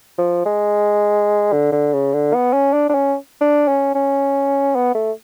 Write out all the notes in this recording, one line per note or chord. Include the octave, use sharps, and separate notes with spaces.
F3
G#3
D3
D3
C#3
D3
B3
C#4
D4
D4
C#4
D4
C#4
C#4
B3
A3